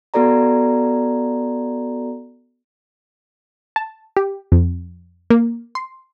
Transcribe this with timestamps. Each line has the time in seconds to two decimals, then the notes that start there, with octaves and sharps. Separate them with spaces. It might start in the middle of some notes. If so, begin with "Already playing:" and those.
0.14 B3 F#4 A4 D5 A#5
3.76 A5
4.17 G4
4.52 F2
5.30 A#3
5.75 C6